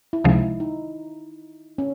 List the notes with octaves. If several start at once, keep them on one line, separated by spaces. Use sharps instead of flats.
E4
C#2 C3 F3 G#3 D#4
E4
D#4
C#4